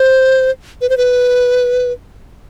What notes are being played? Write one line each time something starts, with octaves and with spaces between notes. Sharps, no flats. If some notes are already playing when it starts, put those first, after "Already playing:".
Already playing: C5
B4
C5
B4